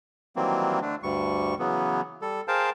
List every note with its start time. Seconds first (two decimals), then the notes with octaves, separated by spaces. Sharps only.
0.36 D#3 E3 F#3 G3 A#3 C4
0.82 D3 A3 D4
1.03 D2 G2 G3 C#6
1.59 C#3 E3 F#3 B3
2.22 G3 A4
2.48 G#4 A#4 C5 F5 G5 A5